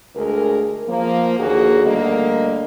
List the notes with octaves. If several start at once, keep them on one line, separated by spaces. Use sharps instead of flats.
D2 G#3 D4 G#4 A#4
F3 A#3
D#2 D3 A#3 F#4 G#4
D2 D3 G3 A#3 A#4 D#5